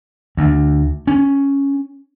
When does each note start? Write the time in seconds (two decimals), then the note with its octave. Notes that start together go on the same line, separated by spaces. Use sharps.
0.37 D2
1.07 C#4